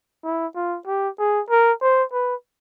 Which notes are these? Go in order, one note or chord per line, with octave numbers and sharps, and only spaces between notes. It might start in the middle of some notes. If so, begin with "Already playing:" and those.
E4
F4
G4
G#4
A#4
C5
B4